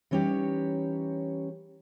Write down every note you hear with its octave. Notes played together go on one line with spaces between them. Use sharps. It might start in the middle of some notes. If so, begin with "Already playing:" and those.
E3 G3 C#4 D#4 G4 C#5